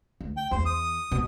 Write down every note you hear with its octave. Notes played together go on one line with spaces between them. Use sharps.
D2
G5
E2 C5
D#6
B2